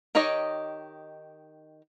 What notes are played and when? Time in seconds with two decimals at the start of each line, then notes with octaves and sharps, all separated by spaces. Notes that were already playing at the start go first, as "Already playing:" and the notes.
0.15 D#3 D#4 G4 C#5 D#5